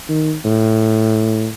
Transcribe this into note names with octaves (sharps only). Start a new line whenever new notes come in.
D#3
A2